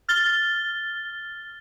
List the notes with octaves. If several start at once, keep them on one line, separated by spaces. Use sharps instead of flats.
F6 A6 G7